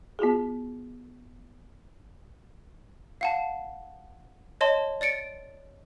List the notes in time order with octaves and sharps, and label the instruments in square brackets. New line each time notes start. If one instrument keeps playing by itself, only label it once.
[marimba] B3 F4 F#4 G#4
[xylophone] F5 F#5 A5
C#5 D#5 A5 C6
D5 A6 C#7 D7